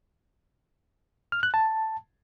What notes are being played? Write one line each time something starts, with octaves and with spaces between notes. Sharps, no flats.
F6
F#6
A5